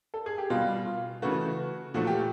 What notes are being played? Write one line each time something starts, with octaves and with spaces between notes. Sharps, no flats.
A4
G#4
G4
B2 G3 F4
F4
C#3 E3 A3 F#4
A#2 F3 A3 F#4
G4